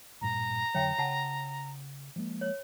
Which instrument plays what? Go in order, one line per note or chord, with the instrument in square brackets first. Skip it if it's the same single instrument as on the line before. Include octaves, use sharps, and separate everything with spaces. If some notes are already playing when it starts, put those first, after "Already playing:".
[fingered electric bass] A1 G2 A#2 [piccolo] A#5
[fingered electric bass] F2 D3 F#3 [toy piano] C#5 E5 G5
[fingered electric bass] C#3 [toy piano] F#4 F#5 A5
[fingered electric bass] F3 G#3 A#3
[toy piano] C#5